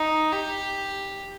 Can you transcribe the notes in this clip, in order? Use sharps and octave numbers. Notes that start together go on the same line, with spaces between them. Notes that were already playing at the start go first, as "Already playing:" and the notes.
Already playing: D#4
G4